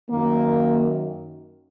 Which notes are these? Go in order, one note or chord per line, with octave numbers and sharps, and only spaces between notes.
F#2 D#3 A#3